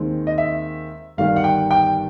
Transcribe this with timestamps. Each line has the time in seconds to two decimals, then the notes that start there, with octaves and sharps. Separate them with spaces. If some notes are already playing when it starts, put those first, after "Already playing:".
Already playing: D#2 D#3 G#3 C4
0.27 D#5
0.38 E5
1.17 G1 G2 D#3 G3 F5
1.36 F#5
1.44 G5
1.71 G5